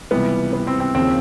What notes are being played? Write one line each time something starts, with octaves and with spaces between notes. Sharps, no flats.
C#2 C3 E3 G3 B3
B3
C4
C4
D#2 C#3 F3 C4